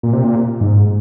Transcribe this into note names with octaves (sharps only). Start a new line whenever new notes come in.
A#2
C3
A#2
G#2